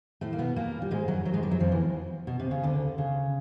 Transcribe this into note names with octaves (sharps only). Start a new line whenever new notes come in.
A2 A3
A#3
B2 B3
A#2 A#3
G3
G#2 G#3
F#2 F#3
F#2 F#3
G#2 G#3
G2 G3
F#2 F#3
F2 F3
E2 E3
B2
C3
C#3
D2 D3
C#3